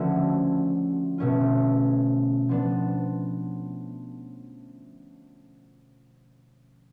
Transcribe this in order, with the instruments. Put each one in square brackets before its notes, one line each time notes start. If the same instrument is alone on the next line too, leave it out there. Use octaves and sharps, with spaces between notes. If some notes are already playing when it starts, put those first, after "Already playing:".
Already playing: [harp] D3 F3 A3 C#4 F#4
B2 A3 C#4 F4
F3 B3 D4